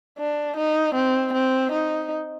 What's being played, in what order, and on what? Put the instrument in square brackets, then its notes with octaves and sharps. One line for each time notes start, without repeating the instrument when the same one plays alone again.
[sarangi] D4
D#4
C4
C4
D#4